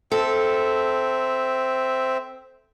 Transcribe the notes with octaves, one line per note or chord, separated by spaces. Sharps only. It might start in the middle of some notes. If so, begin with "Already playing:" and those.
C4 A4 E5